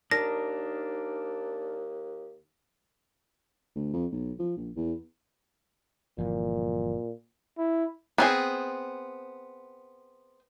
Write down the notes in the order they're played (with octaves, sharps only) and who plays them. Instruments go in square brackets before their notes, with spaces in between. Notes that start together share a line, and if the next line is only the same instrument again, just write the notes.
[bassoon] D#2 [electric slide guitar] D4 D#4 A#4 [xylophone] A#6
[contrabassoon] D2
F2
B1
F3
A#1
E2
[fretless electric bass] G1 E3 F3 [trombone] A#2
[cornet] E4
[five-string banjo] B3 C4 G#4